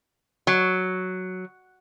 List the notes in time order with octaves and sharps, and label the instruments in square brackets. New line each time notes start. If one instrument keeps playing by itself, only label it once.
[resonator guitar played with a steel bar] F#3